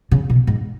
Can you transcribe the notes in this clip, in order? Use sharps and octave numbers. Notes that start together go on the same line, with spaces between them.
C#3
B2
G#2